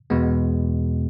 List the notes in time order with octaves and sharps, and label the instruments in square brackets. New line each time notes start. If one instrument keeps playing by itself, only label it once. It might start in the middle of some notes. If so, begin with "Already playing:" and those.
[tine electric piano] E2 B2 G#3 B3